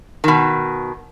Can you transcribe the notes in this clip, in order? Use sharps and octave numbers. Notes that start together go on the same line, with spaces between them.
B2 D#3